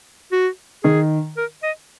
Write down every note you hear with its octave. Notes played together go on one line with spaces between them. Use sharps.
F#4
D#3 G#4
A#4
D#5